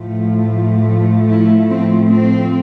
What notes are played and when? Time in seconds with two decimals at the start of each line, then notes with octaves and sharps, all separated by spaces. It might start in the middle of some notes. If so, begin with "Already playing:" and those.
Already playing: A2 F3 A3
1.31 E4
1.70 C4
2.08 C4